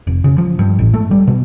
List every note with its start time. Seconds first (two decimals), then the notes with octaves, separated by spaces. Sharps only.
0.07 F1
0.24 C#3
0.38 F3
0.59 G2
0.79 A1
0.94 A3
1.11 G3
1.28 B2